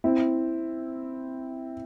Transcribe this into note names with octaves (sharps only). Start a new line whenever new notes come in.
C4 E4